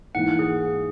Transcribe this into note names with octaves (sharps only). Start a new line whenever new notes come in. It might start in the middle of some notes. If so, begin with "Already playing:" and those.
G#2 E3 A#3 F#5
G#4